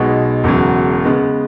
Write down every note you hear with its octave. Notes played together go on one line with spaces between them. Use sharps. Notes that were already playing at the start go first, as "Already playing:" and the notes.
Already playing: B1 B2 G#3
E1 E2 C#3 F#3
C#3 G#3 B3